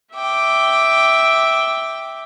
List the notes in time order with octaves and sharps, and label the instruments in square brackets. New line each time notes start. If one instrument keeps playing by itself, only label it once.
[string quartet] E5 G5 D6